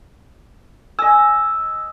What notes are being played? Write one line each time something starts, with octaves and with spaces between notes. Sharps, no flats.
D#5 G#5 E6